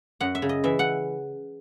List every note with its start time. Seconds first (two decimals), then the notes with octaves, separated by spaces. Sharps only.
0.21 F#2 F#5
0.35 E5
0.42 C#3
0.49 D#5
0.64 E3 E5
0.79 F#5